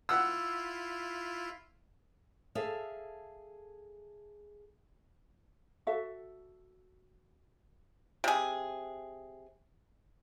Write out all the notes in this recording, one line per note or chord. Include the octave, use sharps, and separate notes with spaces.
E4 F4 F#5 E6
G#4 A4 E5 F5
F#4 A4 E5
C3 G#4